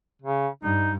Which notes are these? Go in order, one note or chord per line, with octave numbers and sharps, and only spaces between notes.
C#3
G2 D#4